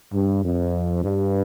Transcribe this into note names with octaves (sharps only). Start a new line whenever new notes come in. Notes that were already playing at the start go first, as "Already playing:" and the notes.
G2
F2
G2